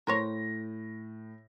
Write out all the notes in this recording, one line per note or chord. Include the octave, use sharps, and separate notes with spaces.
A2 A#4 C5 C#5 A#6